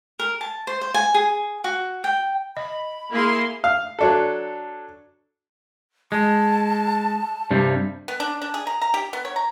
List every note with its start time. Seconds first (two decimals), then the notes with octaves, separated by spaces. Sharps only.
0.19 A#4
0.41 A5
0.67 C5
0.81 C5
0.94 G#5
1.14 G#4
1.64 F#4
2.04 G5
2.57 D#5 B5
3.12 A#3 E4 G#4 C6
3.64 F5
3.99 F#3 D4 A4
6.12 G#3 A5
7.51 G2 C3 G3
8.08 B3
8.20 D4
8.42 D4
8.54 G#4
8.67 A#5
8.82 A#5
8.94 G4
9.13 B3
9.25 C#5
9.36 A#5